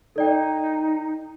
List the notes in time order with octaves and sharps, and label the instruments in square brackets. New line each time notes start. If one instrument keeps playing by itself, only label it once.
[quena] D#4 [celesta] A4 D5 G5